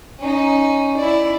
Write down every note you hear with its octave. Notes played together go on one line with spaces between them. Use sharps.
C#4 D#4
E4 D5